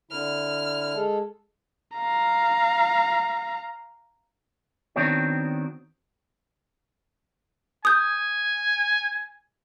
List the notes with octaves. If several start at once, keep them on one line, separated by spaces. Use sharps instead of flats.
D3 E4 F6
G#3 A4
F5 A#5
D#3 B3 C4 D4 F#4 C#5
G#5 D#6 G6